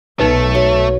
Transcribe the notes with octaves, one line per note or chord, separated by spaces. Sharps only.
B1 A3 D#4 B4
F#3